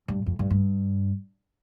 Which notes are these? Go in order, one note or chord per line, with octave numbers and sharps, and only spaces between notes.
G2
F2
G2
G2